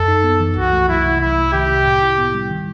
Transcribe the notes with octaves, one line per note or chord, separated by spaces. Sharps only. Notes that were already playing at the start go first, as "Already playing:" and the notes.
Already playing: F#2 A4
D#4
B3
E3
C2 F#4
A3
F#3 E4
C3
C2 E4
A3
D#3 G4
C3
A2
E4
B3
G3
D#3